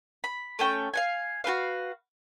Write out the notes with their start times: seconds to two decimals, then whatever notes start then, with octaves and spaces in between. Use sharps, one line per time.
0.24 B5
0.59 A3 C#4 G5
0.94 F5 F#5 G#5
1.44 F#4 G4 B4 F5